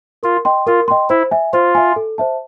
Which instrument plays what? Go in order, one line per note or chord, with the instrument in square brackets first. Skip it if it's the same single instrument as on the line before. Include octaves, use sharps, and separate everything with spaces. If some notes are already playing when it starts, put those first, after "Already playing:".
[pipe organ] F4 [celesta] A#4
[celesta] D#5 G5 C6
[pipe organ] F4 [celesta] A#4
[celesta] D#5 G5 C6
[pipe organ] E4 [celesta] C5
[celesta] E5 G#5
[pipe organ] F4 [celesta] C5
[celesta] E5 G#5
A4
C5 E5 A5